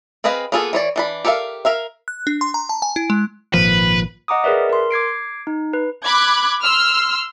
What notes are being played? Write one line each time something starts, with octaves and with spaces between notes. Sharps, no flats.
C4 G#4 B4 D#5 F5
A#3 B3 F4 G#4 A4
E3 C#5 D5
E3 D4 B5
G4 A4 A#4 E5 F5
A#4 E5 F5
F#6
D4
C6
A#5
A5
G#5
E4
G#3
G#1 A#2 F3 B4
D#5 F#5 A#5 D6 D#6
G#4 A#4 B4 D5 E5
A#4 C6
D6 G#6 C7 D7
D#4
B4
B5 D6 F#6 G#6
C6 E6 F6